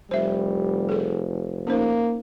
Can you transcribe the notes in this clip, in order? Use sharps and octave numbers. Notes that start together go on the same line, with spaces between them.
F1 G3 C5 E5
G#4 A4
A#3 C#4 D#4 C5